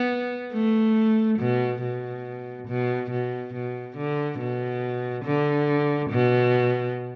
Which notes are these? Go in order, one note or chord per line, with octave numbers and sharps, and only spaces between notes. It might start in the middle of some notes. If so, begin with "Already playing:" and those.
Already playing: B3
A3
B2
B2
B2
B2
B2
D3
B2
D3
B2